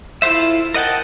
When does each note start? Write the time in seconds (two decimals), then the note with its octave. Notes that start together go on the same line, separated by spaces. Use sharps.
0.22 E4 F4 A4 C5 E5
0.74 A#4 D#5 F#5 G5 A5